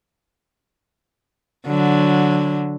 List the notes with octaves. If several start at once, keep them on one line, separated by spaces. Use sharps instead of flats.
D3 F#3